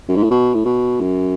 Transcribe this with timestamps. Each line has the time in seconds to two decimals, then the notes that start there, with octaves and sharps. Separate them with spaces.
0.09 F#2
0.16 G#2
0.23 A2
0.31 B2
0.54 A2
0.65 B2
1.00 F#2